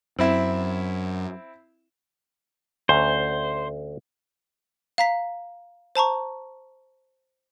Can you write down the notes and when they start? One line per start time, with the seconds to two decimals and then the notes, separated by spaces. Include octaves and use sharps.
0.19 F#2 C4 E4 E5
2.89 D2 C#4 C5 A#5
4.98 F5 A#5 B6
5.95 C5 A5 A#5 C#6